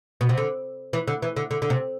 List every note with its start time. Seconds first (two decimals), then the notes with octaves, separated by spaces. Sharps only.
0.21 B2
0.29 C3
0.37 D3
0.93 E3
1.08 D3
1.22 E3
1.36 D3
1.51 D3
1.62 D3
1.70 C3